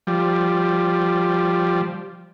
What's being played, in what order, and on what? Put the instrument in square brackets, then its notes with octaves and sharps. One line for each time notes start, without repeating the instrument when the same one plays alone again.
[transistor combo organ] F3 G3